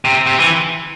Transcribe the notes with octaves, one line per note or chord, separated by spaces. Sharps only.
C3
C3
E3